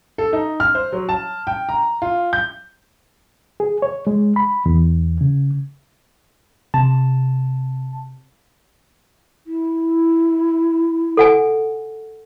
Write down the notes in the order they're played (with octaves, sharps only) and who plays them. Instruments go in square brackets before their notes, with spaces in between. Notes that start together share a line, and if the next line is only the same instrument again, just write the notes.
[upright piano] A4
D#4
F6
C5
F#3
A5
G5
A#5
F4
G6
[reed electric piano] G#4
C#5
G#3
B5
E2
C#3
[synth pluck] C3 [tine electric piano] A5
[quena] E4
[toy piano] A4 F#5 G#5